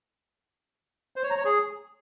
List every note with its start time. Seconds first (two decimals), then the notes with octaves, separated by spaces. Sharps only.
1.16 C5
1.23 C#5
1.30 A#5
1.38 C#5
1.45 G#4